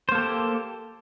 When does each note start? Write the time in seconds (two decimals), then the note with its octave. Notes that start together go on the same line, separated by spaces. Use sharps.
0.09 C5
0.12 A#3
0.15 A4
0.18 G4